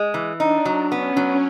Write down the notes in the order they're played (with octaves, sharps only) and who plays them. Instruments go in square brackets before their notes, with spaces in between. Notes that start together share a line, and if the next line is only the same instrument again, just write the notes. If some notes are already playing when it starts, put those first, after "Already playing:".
Already playing: [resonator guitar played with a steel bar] G#3
E3
[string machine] D4 [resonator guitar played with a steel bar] D#4
[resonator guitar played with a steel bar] F#3
[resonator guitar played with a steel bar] B3 [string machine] C#4
[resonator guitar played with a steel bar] F#3